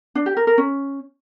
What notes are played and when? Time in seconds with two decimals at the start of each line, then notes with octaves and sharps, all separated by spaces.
0.15 D4
0.26 G4
0.37 A#4
0.47 A#4
0.58 C#4